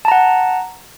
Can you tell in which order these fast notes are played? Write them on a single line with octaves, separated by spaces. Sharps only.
A5 A#5 F#5